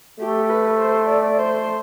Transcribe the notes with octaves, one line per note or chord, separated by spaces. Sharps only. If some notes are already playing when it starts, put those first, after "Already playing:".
A3 G4
B4
C5
D5
C5